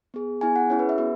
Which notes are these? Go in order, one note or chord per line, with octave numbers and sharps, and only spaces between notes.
B3 G#4
B3 E4 G#4 G#5
F#5
C#4 E4 G#4 C#5
B4
E5
B3 F#4